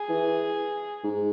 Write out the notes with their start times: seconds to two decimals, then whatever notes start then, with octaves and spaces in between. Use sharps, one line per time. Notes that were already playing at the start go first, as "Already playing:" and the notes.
Already playing: G#4
0.09 E3
1.04 G#2